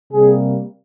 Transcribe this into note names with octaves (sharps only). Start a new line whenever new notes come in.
C3 G3 A#3 G#4